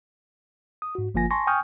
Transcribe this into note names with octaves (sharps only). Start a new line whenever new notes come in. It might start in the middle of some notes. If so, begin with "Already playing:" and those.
D#6
G#2 F#4
G1 F3 A#3 F4 G#5 A#6
G#5 A5 C6 C#6 A#6
G5 G#5 C#6 D#6 F6 G6